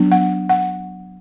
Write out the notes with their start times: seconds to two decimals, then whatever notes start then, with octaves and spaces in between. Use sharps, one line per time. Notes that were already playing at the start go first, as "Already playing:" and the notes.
Already playing: F#3 B3 D4
0.11 F#5
0.49 F#5